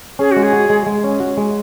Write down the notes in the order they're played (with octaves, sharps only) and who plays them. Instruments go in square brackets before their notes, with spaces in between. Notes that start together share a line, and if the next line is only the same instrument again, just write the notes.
[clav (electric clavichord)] C#4 [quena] G#4
[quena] F#4
[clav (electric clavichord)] G#3
[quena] G#4
[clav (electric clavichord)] F#4
G#3
G#3
C#4
F#4
G#3